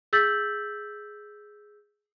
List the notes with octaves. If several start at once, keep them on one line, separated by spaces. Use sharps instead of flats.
G#4 E6 G6 A6 B6 F#7